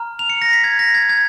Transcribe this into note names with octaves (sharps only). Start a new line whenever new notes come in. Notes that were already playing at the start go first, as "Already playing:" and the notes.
Already playing: A#5 F6
F7
C#7
A#6
B6
G#6
A#6
G#6
G#6